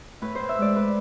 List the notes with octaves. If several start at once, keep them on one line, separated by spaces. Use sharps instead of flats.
A2 B4
A2 C5
E5
G#3 D5
B4